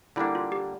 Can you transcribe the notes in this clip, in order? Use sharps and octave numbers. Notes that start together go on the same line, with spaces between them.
D3 G3 A#3 D4 E4
F4
G4